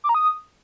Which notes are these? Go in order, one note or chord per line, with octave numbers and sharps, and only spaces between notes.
D6
A#5
D#6